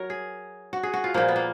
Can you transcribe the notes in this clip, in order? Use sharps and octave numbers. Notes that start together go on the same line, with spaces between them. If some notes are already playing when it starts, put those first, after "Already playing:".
Already playing: F#3 F#4 A#4 C#5
G#4
F#4
G#4
F#4
F4
A#2 F3 A#3
B3
A#3